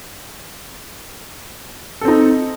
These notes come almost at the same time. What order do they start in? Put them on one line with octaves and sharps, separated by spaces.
A4 C4 D#4